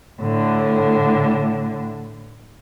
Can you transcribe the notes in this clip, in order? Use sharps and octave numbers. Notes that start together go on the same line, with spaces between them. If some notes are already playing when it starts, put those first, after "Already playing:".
A2 D3